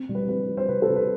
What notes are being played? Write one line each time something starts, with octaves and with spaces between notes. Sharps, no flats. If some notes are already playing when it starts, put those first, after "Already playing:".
Already playing: C4
G3
B4
G3 B4
G3
C5
C3 B4
A4
C3
B4